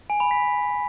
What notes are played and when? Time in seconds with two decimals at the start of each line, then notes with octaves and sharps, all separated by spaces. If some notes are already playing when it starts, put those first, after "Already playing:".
0.10 G#5
0.20 B5
0.31 B6